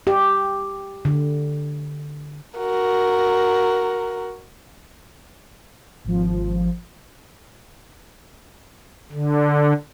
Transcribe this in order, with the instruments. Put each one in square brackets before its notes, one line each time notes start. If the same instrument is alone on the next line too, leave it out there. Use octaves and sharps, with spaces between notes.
[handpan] G4
D3
[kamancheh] F#4 A#4
[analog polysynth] G#1 F3
[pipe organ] D3